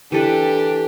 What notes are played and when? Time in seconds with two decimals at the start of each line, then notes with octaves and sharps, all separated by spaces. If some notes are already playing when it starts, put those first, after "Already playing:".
0.12 E3 D4 G4 A4 B4